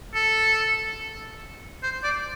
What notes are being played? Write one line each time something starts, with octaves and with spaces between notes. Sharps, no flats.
A4
C5
D5